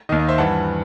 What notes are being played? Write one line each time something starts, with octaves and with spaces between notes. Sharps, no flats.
D#2 D#3 D#5
D#5
C5 E5
G2 E3 F#5 A5